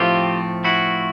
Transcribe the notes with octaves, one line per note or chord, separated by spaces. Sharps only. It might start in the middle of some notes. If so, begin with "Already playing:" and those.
Already playing: A2 F3 A3 C4 F4 G4
E4 F#4